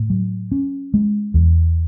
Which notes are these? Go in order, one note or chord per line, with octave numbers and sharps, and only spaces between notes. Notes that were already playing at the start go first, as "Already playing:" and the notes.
Already playing: A2
F#3
C#4
G#3
E2